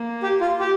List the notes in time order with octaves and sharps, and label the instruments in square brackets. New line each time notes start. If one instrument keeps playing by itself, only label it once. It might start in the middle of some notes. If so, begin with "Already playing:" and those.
Already playing: [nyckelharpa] A#3
[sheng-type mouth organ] G4
F4
G4